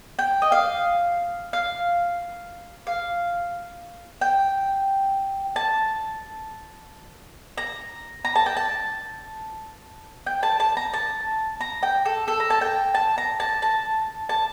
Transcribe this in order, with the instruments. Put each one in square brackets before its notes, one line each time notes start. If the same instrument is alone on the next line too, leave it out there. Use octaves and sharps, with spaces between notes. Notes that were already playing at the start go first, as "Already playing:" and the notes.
[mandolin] G5
D#5
F5
F5
F5
G5
A5
A#5
A#5
A5
G5
A5
G5
A5
A5
A#5
A5
A#5
G5
A4
A4
A#5
A5
G5
A5
A#5
A5
A5
A5